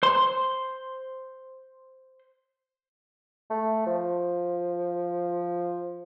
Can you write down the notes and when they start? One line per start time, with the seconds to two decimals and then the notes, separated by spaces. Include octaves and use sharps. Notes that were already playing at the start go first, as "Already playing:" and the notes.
0.03 C5 C6
3.50 A3
3.86 F3